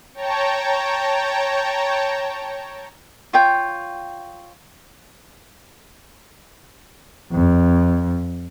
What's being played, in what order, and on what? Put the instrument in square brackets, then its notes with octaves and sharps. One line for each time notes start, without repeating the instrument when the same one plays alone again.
[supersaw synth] C#5 G5 A5 A#5
[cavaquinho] F4 C#5 G5
[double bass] F2